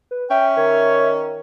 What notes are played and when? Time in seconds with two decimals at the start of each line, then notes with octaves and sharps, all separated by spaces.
0.11 B4
0.31 C#4 E5 G5
0.57 D#3 C#5